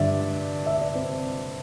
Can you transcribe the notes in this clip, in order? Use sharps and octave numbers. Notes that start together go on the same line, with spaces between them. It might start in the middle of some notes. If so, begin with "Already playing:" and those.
Already playing: G2 D3 D5 E5
E5
D5
C4